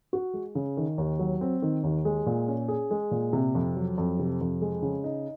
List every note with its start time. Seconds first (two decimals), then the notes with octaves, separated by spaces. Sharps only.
0.13 F#4
0.33 G#3
0.55 C#3
0.77 D#3
0.98 D#2
1.19 F#3
1.41 C4
1.62 D#3
1.83 D#2
2.05 G#3
2.26 A#2
2.48 C#4
2.68 G#4
2.91 G#3
3.11 A#2
3.33 C3
3.55 F2
3.76 F#3
3.98 F2
4.19 C3
4.41 F2
4.61 G#3
4.82 C#3
5.04 D#4